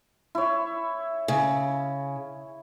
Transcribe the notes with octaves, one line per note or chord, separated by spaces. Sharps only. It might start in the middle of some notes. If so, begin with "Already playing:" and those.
E4 C#5
C#3